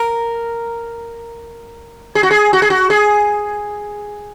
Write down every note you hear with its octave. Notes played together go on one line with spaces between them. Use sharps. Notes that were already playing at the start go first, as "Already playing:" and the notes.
Already playing: A#4
G#4
F#4
G#4
F#4
G#4
F#4
G#4